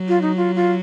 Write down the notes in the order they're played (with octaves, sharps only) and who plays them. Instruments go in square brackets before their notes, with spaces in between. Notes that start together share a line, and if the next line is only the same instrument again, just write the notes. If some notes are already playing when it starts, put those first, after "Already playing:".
Already playing: [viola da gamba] F#3
[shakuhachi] F4
D#4
F4
F4